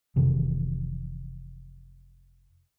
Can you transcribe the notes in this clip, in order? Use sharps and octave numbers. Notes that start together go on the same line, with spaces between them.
F1 C3 D#3 E3